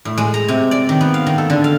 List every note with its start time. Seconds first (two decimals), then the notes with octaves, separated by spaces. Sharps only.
0.05 A2
0.18 G#3
0.34 A#5
0.48 C3
0.71 D5
0.89 D#3
1.01 B3
1.14 F5
1.26 D#3
1.38 A4
1.50 D3
1.64 F5